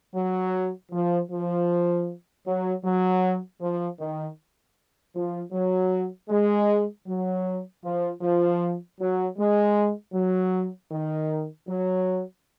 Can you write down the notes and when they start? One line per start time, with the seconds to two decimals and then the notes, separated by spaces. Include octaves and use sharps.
0.15 F#3
0.92 F3
1.30 F3
2.45 F#3
2.83 F#3
3.60 F3
3.99 D#3
5.14 F3
5.52 F#3
6.29 G#3
7.06 F#3
7.83 F3
8.21 F3
8.99 F#3
9.37 G#3
10.14 F#3
10.91 D#3
11.67 F#3